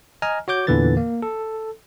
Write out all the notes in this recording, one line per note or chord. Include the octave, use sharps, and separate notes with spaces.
D#5 G#5 A#5 F6
F#4 C#5 D6 G6
E2 A#2 D3 E3 B4 A6
A#3
A4